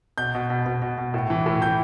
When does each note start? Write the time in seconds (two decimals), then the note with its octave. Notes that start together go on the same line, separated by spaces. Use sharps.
0.18 B2 G6
0.35 B2
0.50 B2
0.66 B2
0.82 B2
0.98 B2
1.14 A2
1.30 E3
1.46 A2
1.61 E3 G6